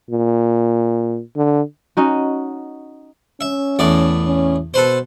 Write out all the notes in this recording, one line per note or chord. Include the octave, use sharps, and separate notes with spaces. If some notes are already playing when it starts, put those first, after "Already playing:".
A#2
D3
C#4 D#4 F#4
C#4 E5
E2 A2 D5
C#4
B2 A4 B4 C5